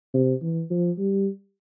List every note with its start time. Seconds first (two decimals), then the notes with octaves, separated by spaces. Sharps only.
0.14 C3
0.42 E3
0.71 F3
0.98 G3